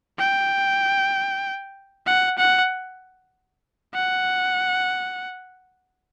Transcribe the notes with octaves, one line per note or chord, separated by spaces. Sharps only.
G5
F#5
F#5
F#5